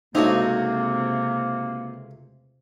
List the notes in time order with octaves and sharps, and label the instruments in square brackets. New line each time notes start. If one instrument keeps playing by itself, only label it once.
[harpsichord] C#2 A3 C4 [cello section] C3 [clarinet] A#3 [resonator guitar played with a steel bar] D#4 F#4